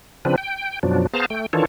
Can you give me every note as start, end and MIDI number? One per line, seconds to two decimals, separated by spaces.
0.25 0.36 49
0.25 0.36 53
0.25 0.36 60
0.25 0.36 62
0.25 0.36 71
0.38 0.79 79
0.83 1.07 42
0.83 1.07 47
0.83 1.07 53
0.83 1.07 54
0.83 1.07 62
1.14 1.26 59
1.14 1.26 68
1.14 1.26 72
1.14 1.26 77
1.14 1.26 81
1.14 1.26 82
1.30 1.46 57
1.30 1.46 79
1.53 1.65 51
1.53 1.65 52
1.53 1.65 62
1.53 1.65 65
1.53 1.65 69
1.53 1.65 73